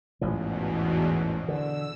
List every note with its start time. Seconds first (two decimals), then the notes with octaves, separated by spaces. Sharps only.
0.21 A1 E2 G#2 B2 F3
1.48 D3 E6